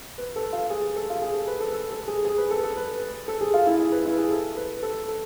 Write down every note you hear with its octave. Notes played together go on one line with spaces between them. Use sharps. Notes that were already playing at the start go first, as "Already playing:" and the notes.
B4
A4
F4
G#4
A4
F4
G#4
A4
B4
A4
A4
A4
G#4
G#4
B4
A4
A4
B4
A4
G#4
F4
E4
G#4
B4
E4
G#4
A4
B4
A4
A4